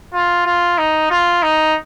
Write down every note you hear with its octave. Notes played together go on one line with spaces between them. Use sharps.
F4
F4
D#4
F4
D#4